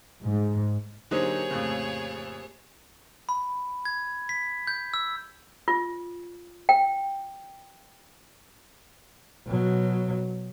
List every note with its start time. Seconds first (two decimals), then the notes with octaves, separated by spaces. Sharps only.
0.23 G#2
1.11 D3 F#3 A#3 D#4 G4 G#4 C5 C#5
1.51 F2 A2 C#3
3.29 B5
3.85 G#6
4.29 B6
4.67 G6
4.94 E6
5.68 F4
6.69 G5
9.46 B2 F#3